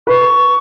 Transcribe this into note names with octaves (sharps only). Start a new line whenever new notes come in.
B4 C#6